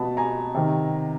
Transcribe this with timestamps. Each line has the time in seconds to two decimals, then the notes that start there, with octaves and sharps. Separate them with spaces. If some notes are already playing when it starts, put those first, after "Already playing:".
Already playing: B2 A5 B5
0.17 G#5 A#5
0.55 C3 D#3